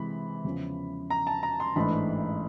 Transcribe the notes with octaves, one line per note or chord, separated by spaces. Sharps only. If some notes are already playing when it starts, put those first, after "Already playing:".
Already playing: C3 E3 G#3 B5
E2 C#3 F3
A#5
A5
A#5
C6
A1 G#2 E3 A3 D4 B5